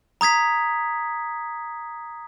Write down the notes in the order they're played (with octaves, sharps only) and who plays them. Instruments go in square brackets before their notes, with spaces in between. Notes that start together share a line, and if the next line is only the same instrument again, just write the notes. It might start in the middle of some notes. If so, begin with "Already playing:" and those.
[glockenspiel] A#5 D#6 G#6 B6